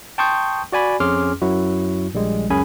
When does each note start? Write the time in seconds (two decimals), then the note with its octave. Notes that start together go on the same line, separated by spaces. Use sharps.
0.18 G5 A5 C6 C#6 D#6 G6
0.72 F#4 D5 G#5 B5
1.00 F2 C#4 G#4 C6 D6 F6
1.42 F#2 F#3 E4 F#4
2.14 A#1 G3 G#3
2.50 C#2 F#2 C#4 G#4 G#5 B5